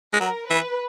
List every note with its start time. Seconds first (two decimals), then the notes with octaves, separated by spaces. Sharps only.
0.13 G#3
0.20 F#3 A#4
0.50 E3 B4